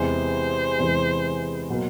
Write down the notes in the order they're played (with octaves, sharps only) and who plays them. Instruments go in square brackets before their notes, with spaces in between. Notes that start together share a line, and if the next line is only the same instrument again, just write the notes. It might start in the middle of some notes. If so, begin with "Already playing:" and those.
Already playing: [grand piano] E2 C3 E3 G#3 [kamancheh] C5
[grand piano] E2 C3 E3 G#3
B2 F#3 A#3